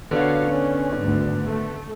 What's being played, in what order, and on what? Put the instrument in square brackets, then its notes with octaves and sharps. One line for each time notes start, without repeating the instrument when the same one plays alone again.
[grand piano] D3 B3 D4 [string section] F#4 C#5 F5
[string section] C#4
G#1 D2
A3